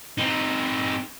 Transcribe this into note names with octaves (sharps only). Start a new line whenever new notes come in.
C4 D#4